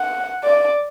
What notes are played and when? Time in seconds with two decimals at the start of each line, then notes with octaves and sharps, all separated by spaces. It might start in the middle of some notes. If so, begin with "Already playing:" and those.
Already playing: F#5
0.44 D5